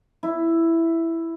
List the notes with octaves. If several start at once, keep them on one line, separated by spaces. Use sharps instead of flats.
E4